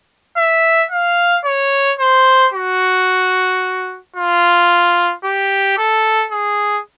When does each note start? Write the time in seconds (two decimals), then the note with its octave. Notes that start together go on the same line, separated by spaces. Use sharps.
0.37 E5
0.91 F5
1.45 C#5
2.00 C5
2.54 F#4
4.16 F4
5.24 G4
5.78 A4
6.32 G#4